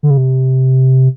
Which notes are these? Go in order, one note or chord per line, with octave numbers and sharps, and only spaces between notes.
D3
C#3
C3